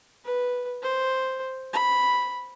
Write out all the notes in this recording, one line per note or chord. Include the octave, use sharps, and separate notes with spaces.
B4
C5
B5